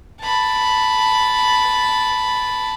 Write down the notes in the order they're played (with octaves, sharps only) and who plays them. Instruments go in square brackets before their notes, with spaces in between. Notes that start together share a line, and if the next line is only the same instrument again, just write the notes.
[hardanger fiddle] A5 B5